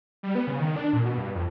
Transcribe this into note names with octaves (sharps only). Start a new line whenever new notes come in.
G3
B3
C#3
D#3
D4
A#2
B2
G2
F2